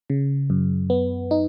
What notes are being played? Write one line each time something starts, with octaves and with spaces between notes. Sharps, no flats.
C#3
F#2
B3
D#4